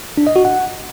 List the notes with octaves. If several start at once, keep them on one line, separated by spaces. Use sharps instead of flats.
D4
D#5
F#4
F#5